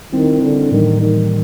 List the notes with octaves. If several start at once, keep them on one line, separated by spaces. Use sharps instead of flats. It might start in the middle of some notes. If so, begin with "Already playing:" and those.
D#3 G3 C4 E4
D3
A2 D#3 E3 G3 A#3
D#3